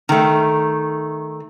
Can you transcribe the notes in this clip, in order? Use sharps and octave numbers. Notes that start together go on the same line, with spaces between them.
D#3 A3